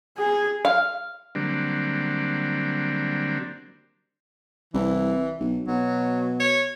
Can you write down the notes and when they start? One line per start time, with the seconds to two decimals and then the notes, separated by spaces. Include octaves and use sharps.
0.18 G#4
0.65 F5
1.35 D3 F#3 G3 A#3 C4 D4
4.74 C2 E3
5.40 B1
5.68 B2 F#3
6.40 C#5